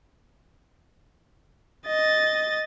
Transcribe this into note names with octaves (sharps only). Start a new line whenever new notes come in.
D#5 A6